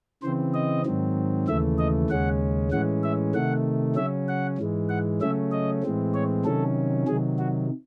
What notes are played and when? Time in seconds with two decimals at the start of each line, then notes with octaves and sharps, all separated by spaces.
0.22 C#3 E3 C4 C5
0.54 D#5
0.85 G#2 D#3 F#3 C4
1.48 D#2 C#3 E3 A3 E5
1.78 D#5
2.10 D#2 C#3 G#3 C#4 F#5
2.72 A2 E3 G#3 C#4 F#5
3.03 E5
3.34 C3 D#3 A3 F#5
3.96 C#3 F#3 C#4 E5
4.28 F#5
4.58 G#2 E3 G#3
4.89 F#5
5.21 C#3 F#3 A3 C#4 E5
5.51 D#5
5.83 A2 E3 G#3 C4
6.14 C#5
6.45 C3 D#3 F#3 C#4 A4
7.07 C3 D#3 F#3 G#4
7.39 F#4